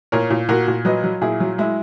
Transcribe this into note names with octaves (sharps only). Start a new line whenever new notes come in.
A#2 A#4 C#5
A#2
A#2 F#4 A#4
A#2
F#3 B4 D#5
F#3
A#2 E4 G#4
F#3
G#3 E4